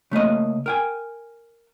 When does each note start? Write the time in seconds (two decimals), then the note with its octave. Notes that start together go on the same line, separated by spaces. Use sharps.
0.11 C#3 A3 A#3 D#5
0.66 A#4 G5 G#5